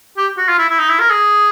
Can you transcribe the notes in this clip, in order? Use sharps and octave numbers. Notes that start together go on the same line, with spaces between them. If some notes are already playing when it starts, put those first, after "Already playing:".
G4
F#4
F4
E4
E4
D#4
E4
A#4
G#4